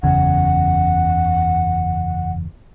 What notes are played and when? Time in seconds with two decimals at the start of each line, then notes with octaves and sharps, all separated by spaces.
0.03 F#1 E2 C#3 F#5